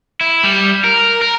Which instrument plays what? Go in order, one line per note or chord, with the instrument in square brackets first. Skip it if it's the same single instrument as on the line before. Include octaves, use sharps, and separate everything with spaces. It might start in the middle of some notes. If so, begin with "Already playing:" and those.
[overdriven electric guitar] E4
G3
A#4
A#4